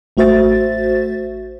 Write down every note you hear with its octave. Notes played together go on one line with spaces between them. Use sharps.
A1 A3 F#4 C5 E5 A6